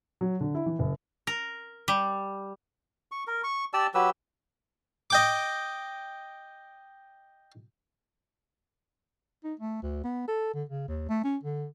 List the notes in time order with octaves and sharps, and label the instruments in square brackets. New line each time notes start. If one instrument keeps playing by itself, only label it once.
[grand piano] F#3
D3
E4
E3
F#1
[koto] A#4
G3
[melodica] C#6
A#4
C#6
G4 D5 A5 E6
F#3 G4 B4 E6
[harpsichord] D#5 G5 D6
[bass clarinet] D#4
A3
D2
B3
A4
D3
C#3
D#2
A3
C#4
D3